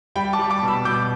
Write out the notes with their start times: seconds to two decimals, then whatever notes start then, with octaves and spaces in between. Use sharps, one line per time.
0.16 G3 G5 B5
0.33 A5 D6
0.39 G3
0.50 A5 D6
0.62 B2
0.68 B5 E6
0.85 B2 D6 G6